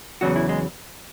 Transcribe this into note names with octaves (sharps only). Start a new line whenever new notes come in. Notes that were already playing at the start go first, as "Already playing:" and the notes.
E2 C#3 F#3 F#4
E4
G#3